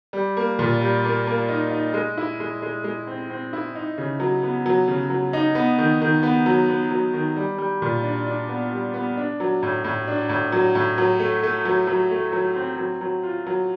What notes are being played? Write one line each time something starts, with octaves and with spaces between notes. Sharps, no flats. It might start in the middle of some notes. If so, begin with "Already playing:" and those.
G3
A#3
A#2
G3
A#3
A#3
D#4
D#4
G#3
E4
G#3
G#3
G#3
C4
C4
E4
D#4
C#3
F#3
B3
F#3
C#3
F#3
D#4
B3
D#3
D#3
B3
F#3
B3
F#3
D#3
G3
G3
A#2
D4
D4
B3
G3
B3
D4
F#3
A2
A2
D4
A2
F#3
A2
F#3
A3
A3
F#3
F#3
A3
F#3
C4
F#3
F#3
F4
F#3